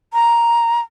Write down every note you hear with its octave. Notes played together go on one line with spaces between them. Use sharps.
A#5